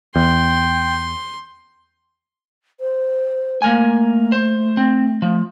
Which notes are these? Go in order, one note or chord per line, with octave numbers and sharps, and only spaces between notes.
E2 G5 C6
C5
A3 A#3 A#4 G#5
C5
C4
F3 A3